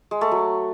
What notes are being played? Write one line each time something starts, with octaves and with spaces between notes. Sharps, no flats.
G#3
A3
F#3